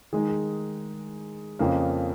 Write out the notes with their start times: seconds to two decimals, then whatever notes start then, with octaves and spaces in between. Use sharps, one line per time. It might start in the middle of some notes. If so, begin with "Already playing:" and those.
0.13 D#3 G#3 D#4 G#4
0.29 G#4
1.59 F2 C#3 F3 A#3 A#4